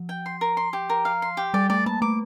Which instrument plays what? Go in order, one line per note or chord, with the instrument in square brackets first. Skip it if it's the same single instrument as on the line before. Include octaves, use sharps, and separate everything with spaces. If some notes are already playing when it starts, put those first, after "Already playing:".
Already playing: [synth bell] F3
[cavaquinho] G5
C6
A#4
C6
G4
A#4
F5
C6
G4
[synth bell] G3 [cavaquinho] D5
[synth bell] A3 [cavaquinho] D5
[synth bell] A#3 [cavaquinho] A5
[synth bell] A3 [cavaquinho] D6